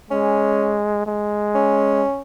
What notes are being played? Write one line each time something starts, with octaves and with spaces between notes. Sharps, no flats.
G#3 C#4
G#3
C#4